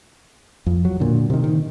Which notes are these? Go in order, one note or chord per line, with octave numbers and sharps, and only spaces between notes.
F2
F#3
A#2 D3
C3 D#3
D#3